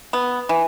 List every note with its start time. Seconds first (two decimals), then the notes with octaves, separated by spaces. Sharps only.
0.13 B3
0.49 E3